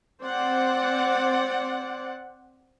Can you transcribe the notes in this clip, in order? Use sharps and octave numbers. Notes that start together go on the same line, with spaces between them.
C4 C5 D5 F#5